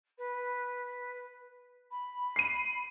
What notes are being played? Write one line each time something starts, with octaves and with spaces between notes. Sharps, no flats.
B4
B5
C7 D#7